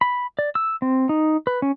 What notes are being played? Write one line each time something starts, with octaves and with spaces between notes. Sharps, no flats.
B5
D5
E6
C4
D#4
B4
C#4